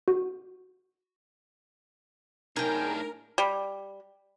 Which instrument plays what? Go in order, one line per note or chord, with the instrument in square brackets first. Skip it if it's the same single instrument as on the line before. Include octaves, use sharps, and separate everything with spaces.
[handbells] F#4
[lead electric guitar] A2 D4 [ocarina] D#4 [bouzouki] G#4 G5 [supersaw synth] A#4
[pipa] G3